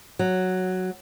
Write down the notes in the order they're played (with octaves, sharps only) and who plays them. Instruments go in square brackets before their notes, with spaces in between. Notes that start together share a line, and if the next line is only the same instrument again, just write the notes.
[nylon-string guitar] F#3